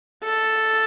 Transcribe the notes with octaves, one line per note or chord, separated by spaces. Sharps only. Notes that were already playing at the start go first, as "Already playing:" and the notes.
A4